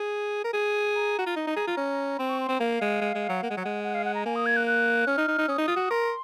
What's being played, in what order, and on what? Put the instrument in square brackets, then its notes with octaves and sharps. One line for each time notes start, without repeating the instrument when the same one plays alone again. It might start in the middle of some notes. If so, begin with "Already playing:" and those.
Already playing: [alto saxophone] G#4
A#4
G#4
[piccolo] A#5
[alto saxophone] F#4
F4
D#4
D#4
G#4
F4
C#4
[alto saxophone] C4 [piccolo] C6
[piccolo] C#6
C6
[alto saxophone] C4
[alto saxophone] A#3 [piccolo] F5
[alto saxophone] G#3
G#3
G#3
F#3
[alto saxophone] A#3 [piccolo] F#5
[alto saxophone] G#3
F#3
G#3
[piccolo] F#5
F5
F#5
A#5
[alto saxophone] A#3 [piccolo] G#5
[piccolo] D#6
G#6
F#6
F#6
[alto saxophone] C#4 [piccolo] F6
[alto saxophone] D#4
D#4
D#4
[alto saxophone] C#4 [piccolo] D#6
[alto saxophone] D#4
F4
F#4
[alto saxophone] A#4 [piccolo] C6